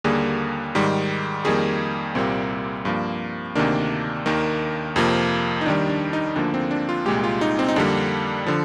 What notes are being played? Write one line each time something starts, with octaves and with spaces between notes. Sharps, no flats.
D#2 D3 G3 A#3 G#4
G#2 D#3 G3
F2 D#3 G3 A#3 G#4
C2 A#2 G3 A#3 C4
G2 F3 A#3
D2 C3 D#3 A#3 D4
D#2 D#3 A#3
F2 C3 F3 A#3
D#4
D#2 D#3 G3 D4
D4
D#4
D2 D3 F3 A#3 D4
C4
D4
F4
C2 A#2 G#3 G4
F4
D#4
C4
D#4
F2 D3 G3 A#3 D4
D3 F3